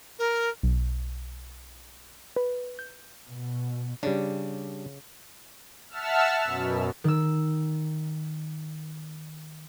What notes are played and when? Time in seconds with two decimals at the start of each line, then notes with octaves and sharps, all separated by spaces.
0.19 A#4
0.63 B1
2.36 B4
2.79 G6
3.29 B2
4.03 C#3 G3 D4
5.89 E5 F#5 A5 E6 F6
6.44 F#2 B2
7.04 D#3 E6